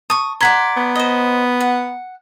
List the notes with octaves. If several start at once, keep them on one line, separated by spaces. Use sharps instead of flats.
A5 C#6 D#6
D5 F#5 A#5 C6 G#6 B6
B3
C5 D#5
F#5